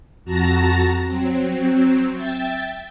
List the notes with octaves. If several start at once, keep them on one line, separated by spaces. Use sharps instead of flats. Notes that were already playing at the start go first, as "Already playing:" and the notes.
F2 F#4 A5 A#5 A#6
F#3 C4
E5 G5 A6